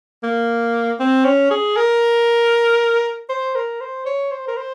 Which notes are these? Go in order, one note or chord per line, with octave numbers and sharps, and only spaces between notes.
A#3
C4
C#4
G#4
A#4
C5
A#4
C5
C#5
C5
A#4
C5